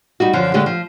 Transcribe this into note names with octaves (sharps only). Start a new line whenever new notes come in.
G3 D#4 F#4
F#2 D3 F3
D3 G#3 A3 G4
F3